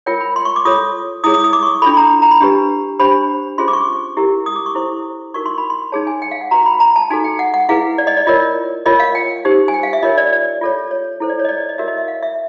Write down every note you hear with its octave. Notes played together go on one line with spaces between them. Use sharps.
F4 A#4 C#5 G5
B5
C6
C#6
D6
F4 A4 C#5 D#6
E4 G#4 C#5 D#6
D#6
D#6
D6
C#6
D4 F4 A4 B5
A#5
A#5
B5
D4 G4 B4
D4 G4 C5 B5
C#4 F4 G#4 C5 C6
D6
C#6
E4 G4 A#4
D#6
D6
C#6
E4 A4 C5
D#4 F#4 A#4 C#6
C6
B5
C6
D#4 G#4 C#5 A5
G#5
G5
F5
F#5
F#4 B4 A#5
B5
A#5
A5
D#4 F#4 A4 G#5
G5
F#5
F#5
E4 G#4 B4 F5
D5
D#5
D5
F4 A#4 C#5 D#5
F4 A#4 C#5 D#5
F5
G5
D#4 G4 C5
G#5
G5
F5
E5
F4 A#4 C#5 D#5
D5
D5
F4 A4 C#5
C#5
E4 A4 C5
D5
C#5
D#5
D5
D#5
F#4 A#4 C#5 E5
D#5
E5
F5
E5